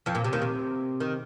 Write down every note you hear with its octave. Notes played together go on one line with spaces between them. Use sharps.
F2 F3
A#2
C3
D#2 D#3
C3
D#3